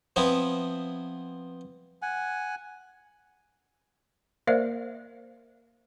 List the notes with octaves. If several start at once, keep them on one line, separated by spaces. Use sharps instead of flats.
F3 B3 C4 E4
F#5 G#5
A#3 A#4 C5 D5 E5 F5